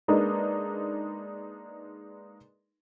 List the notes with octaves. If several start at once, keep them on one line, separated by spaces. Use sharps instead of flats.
G#3 A#3 D4 D#4 B4